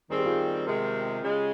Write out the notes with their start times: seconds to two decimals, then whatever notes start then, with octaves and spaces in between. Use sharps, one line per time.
0.10 D#3 G3 C4 G#4
0.18 G4
0.25 F4 G#4
0.66 C3 D#3 G#3
1.22 C#3 G#3